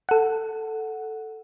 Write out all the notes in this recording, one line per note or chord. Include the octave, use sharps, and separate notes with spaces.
A4 F#5